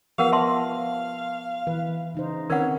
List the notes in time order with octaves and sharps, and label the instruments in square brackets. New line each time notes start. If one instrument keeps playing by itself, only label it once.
[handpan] F3 B3 B4 [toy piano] G4 A#4 F#5 [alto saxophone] F5
[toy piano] E5 A5 C6 [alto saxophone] F5
[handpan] E3 B4
C#3 D#4 C5
[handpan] D#3 C4 B4 [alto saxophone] C#4 [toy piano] A#4 F#5